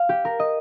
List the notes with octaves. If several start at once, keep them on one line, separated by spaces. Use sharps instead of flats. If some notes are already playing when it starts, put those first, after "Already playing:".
Already playing: F5
G4
A#4
D#5